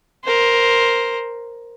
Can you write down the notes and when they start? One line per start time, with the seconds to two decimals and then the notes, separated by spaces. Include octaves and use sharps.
0.25 A#4 C5